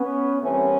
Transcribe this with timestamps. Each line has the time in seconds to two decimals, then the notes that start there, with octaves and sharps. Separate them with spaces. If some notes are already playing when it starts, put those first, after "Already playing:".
Already playing: B3 C#4
0.41 C2 C3 E3 A3 B3 C#4